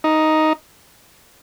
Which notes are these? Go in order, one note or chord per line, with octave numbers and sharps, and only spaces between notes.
D#4